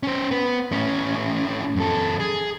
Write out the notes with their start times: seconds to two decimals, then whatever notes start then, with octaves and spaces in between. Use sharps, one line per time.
0.03 C#4 C5
0.31 B3 B4
0.72 A2 C#4
1.76 F#2 A4
2.20 G#4